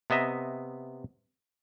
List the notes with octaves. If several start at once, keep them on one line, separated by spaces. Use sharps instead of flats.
C3 B3 D#5 E5 A#5